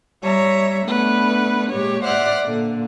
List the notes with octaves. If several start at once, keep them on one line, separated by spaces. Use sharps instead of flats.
G3 C#5 E5 A#5
A3 B3 D4 B4
A#2 G#3 G4 C#5
C5 D5 E5 F#5 F6 F#6
A#2 D3